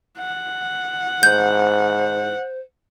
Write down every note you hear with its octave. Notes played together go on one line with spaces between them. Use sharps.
F#5
G#2 C5 G6